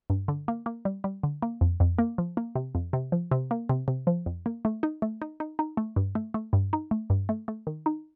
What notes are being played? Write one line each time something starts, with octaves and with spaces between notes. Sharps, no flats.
G2
D3
A#3
A#3
G3
G3
D3
A#3
F2
F2
A#3
F3
A#3
C3
F2
C3
F3
C3
A#3
C3
C3
F3
F2
A#3
A3
D#4
A3
D#4
D#4
D#4
A3
G2
A3
A3
G2
D#4
A3
G2
A3
A3
D#3
D#4